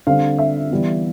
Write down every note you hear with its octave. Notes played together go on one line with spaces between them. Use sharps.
D3 G3 C4 F5
E5
E3 G3 B3